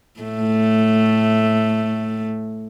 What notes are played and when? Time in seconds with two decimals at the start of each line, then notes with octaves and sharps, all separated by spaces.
0.20 A2 A3